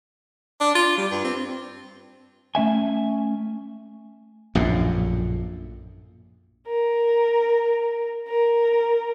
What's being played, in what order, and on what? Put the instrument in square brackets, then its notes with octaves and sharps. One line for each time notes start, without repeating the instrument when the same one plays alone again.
[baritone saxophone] D4
F4
G3
G2
C4
[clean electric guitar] A3 C#4 E5 G#5
[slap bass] A#1 F#2 A2
[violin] A#4
A#4